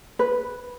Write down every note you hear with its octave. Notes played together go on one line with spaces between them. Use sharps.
B4